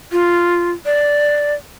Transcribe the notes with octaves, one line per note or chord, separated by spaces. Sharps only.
F4
D5